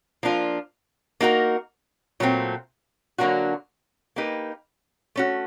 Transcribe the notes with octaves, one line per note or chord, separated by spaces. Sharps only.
F3 A#3 D4 F4
A#3 D#4 F#4 A#4
A#2 F#3 A3 C4
D3 F#3 A#3 D4 F#4
A#3 D#4 G4 B4
A3 C#4 F#4